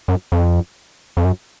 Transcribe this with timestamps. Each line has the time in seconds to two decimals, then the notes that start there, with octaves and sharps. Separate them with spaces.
0.08 F#2
0.32 F2
1.17 F2
1.25 F#2